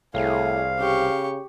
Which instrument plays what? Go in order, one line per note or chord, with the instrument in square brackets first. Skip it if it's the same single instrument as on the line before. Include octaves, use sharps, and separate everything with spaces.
[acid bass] C2 [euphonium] A2 [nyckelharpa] G#4 [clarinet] F5
[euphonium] C#3 [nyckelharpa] G4 C#6